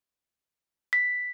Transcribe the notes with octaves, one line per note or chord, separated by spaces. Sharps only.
B6